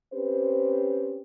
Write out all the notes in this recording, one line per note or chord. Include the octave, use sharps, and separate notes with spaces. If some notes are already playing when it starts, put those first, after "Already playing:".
C4 C#4 G4 B4 C5